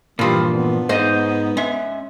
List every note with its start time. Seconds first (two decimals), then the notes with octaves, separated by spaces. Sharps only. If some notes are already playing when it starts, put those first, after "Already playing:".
0.19 G2 A#2 E3 F3 G3
0.53 B3
0.89 G#2 D#4 C5 D#5
1.57 G#3 C#4 E5